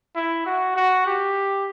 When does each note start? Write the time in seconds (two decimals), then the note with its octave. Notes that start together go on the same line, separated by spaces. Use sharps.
0.15 E4
0.46 F#4
0.76 F#4
1.06 G4